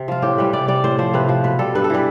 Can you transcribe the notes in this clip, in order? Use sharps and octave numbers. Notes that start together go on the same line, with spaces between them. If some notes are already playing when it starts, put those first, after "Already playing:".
Already playing: C3
F3 F4
A2 G4
E3 G3 B4
C3 D5
G3 D5
A2 C5
F3 C5
C3 B4
F3
B2 B4
G3 A4
G2 B4
A4
E3 G3 B4